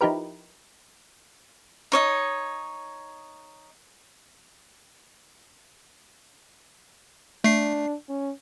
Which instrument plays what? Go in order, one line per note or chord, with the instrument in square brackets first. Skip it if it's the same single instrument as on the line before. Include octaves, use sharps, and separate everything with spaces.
[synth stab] F3 D#4 E4 G4 A#4 B4
[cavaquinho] D#4 C#5 D#5
[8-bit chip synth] A3 C7 [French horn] D4
[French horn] C#4